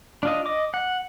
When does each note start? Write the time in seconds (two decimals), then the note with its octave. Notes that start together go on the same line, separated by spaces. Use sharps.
0.23 D4 F4 D#5
0.46 D#5 D6
0.74 F#5